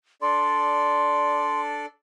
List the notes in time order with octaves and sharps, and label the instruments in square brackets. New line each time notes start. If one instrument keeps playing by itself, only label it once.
[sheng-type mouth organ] D4 A4 D5 [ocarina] C6